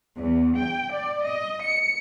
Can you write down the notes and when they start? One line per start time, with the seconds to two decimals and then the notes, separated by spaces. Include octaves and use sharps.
0.18 E2
0.58 G5
0.94 D5
1.26 D#5
1.63 C#7